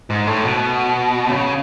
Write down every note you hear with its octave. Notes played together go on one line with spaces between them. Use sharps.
G#2
A2
B2
C#3